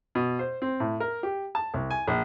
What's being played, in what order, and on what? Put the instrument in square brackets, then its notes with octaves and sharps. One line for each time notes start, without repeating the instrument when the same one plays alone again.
[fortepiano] B2
C5
C4
A2
A#4
G4
A5
C2
G#5
A#1